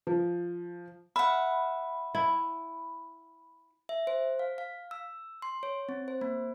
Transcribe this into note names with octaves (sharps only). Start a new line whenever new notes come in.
F3
E5 F#5 B5
E4
E5
C5
F5
F5
E6
C6
C#5
C4
C5
A#3